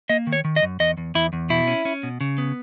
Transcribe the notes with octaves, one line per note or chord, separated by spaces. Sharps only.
A#3 D#5
D#3
C#5
D#3
D#5
F#2
E2 D#5
E2
E2 E4
E2
B2 E4
C#4
C#4
B2
C#3
B3